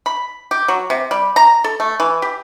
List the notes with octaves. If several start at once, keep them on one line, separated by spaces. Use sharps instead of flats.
B5
G4
F#3
C3
G3
A#5
A4
A3
E3
G4